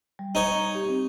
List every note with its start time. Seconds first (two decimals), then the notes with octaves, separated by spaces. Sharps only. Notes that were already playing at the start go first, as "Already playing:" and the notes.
0.19 G3
0.35 D#4 C#5
0.75 G4
0.89 C4